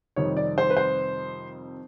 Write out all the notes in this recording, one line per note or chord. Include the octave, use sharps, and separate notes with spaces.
F2 C3 D#3 G3 C#5
D5
C5
B4
C5